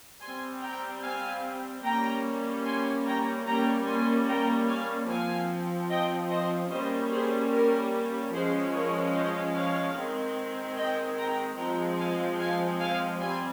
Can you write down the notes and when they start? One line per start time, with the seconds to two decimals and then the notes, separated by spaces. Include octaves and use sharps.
0.22 G3 C4 G#5 C6
0.62 G5 A#5
1.03 F5 G#5
1.84 G3 A#3 C#4 G5 A#5
2.65 G#5 C6
3.06 G5 A#5
3.46 G3 A#3 C#4 G5 A#5
3.87 G#5 C6
4.28 G5 A#5
4.68 F5 G#5
5.08 F3 C4 F5 G#5
5.90 D#5 G5
6.30 C5 D#5
6.71 G3 A#3 C#4 C5 D#5
7.12 G#4 C5
7.52 G4 A#4
8.33 F3 G#3 C#4 G#4 C5
8.74 A#4 C#5
9.14 C5 D#5
9.55 C#5 F5
9.96 D#3 G#3 C4
10.76 D#5 G5
11.18 G5 A#5
11.58 F3 G#3 C4 G5 A#5
11.99 F5 G#5
12.39 F5 G#5
12.79 F5 G#5
13.20 G3 C4 G#5 C6